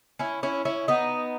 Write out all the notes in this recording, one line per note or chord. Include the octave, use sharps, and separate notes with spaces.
C#4 E4
C#4 E4
C#4 E4
B3 D#4